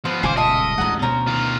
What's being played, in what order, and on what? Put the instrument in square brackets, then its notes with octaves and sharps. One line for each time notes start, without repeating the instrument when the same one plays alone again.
[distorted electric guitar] F3 B3 [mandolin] C5 F6
[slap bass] D#1 C#2 B2 [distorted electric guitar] C5 [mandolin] F5 G#5 D6
[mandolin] F4 A4 E5 [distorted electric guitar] D#5
[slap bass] A1 D2 G#3 [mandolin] F#5 A#5
[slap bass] D2 B2 [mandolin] C#4 A#4 C5
[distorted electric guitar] D#3 F4